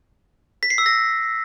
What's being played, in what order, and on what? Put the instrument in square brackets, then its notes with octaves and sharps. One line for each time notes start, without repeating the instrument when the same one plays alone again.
[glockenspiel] B6
C7
E6
A#6